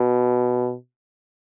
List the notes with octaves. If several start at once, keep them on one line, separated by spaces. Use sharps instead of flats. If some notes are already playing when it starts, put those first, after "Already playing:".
Already playing: B2